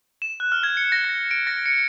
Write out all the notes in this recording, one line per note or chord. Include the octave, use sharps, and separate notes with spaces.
E7
F#6
F6
G#6
C#7
A#6
A#6
D7
A#6
C#7